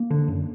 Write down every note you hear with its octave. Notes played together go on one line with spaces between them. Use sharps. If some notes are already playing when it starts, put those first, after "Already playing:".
Already playing: A#3
D3
F#2